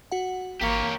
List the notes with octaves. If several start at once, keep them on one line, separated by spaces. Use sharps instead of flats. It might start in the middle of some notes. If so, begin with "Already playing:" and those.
F#4 F#5
G#1 A#3 G4 C#5 B6